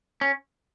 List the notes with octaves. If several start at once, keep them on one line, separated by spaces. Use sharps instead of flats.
C#4